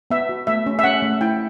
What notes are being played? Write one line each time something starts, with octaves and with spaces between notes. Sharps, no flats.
B3 E5
F#4
A3 E5
C#4
E5
C#4 F#5
A3
E4 G5